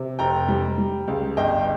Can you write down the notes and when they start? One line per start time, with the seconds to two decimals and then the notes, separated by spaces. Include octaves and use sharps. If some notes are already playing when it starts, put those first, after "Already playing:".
Already playing: C3
0.19 F1 G5 A#5
0.48 G3
0.78 G3
1.08 C#2
1.37 G1 D#5 G5